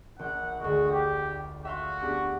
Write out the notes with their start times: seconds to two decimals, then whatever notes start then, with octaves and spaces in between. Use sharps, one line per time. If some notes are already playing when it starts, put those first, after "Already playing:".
0.19 A#1 F#5 G6
0.60 D2 G#3 F#4
0.91 G4
1.65 F#4 E5 F5 C6
2.00 B3 D4 G4